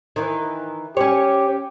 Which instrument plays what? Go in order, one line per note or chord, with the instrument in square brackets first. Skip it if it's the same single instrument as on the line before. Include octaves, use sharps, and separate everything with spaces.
[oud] D#3 E3
[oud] C#4 C#5 [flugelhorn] G4